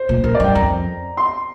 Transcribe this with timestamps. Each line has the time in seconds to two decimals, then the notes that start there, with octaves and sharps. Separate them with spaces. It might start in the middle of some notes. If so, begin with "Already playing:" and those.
Already playing: C5
0.09 A#2
0.24 A#2 A#4
0.35 D5
0.40 G2
0.44 G5
0.55 F2 A#5
1.17 C6